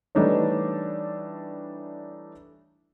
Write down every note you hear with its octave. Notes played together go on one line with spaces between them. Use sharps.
E3 G3 A3 D4 D#4 C#5